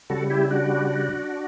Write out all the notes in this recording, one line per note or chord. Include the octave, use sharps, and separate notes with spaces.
C#3 G3 F#4 A4
E4 G4
D4 F#4